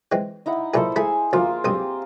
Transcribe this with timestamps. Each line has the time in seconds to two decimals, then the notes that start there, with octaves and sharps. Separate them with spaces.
0.12 E3 G#3 C4
0.46 D#4 E4 F#5
0.74 B1 A#2 E4 G#4 A4 C5
0.96 A3 E4 G#4 G#5 B5
1.33 D2 F3 A#3 F4
1.64 B1 G2 C4 G4 D#6